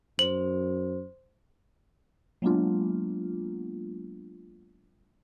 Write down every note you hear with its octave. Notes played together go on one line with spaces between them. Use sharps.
F#2 C5 F#7
F#3 G#3 A#3 B3 D4 F4